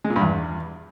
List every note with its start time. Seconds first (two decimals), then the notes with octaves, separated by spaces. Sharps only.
0.04 G#3
0.10 A#2
0.16 G2
0.21 E2